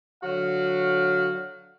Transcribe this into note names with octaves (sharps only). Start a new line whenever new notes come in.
D3 F#3 F#4 F5